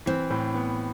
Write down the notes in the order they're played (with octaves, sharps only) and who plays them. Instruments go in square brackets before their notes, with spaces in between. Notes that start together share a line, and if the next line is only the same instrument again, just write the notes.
[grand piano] E3 [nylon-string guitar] C4
[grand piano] A2
B3